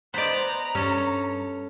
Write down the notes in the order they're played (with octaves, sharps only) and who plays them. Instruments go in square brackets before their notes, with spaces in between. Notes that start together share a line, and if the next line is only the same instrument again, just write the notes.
[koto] B3 D5 [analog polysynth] C5 D#5 [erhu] A#5
[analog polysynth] G2 [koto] C#4 A4